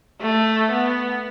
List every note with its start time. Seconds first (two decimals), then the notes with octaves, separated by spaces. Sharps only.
0.21 A3
0.71 B3